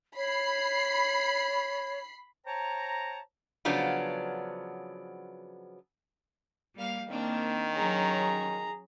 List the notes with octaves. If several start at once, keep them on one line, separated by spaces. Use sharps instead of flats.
C#5 B5 C7
C5 C#5 G5 A5 A#5
C#3 F3 F#3 B3 D4
G3 A#3 F5
D#3 A#3 C4 D4
F#3 C#4 G#4 C#5 A#5